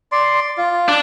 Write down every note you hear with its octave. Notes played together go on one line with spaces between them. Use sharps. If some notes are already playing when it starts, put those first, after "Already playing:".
D5 C6
F4
D4